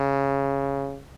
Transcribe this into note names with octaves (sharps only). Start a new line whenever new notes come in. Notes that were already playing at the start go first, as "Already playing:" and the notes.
Already playing: C#3